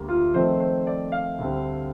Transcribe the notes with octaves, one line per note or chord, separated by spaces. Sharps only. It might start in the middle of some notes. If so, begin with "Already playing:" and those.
Already playing: D2 D3 G3 A#3
F4
F2 D#3 A3 C4 C5
C5
D5
F5
D2 D3 G3 C4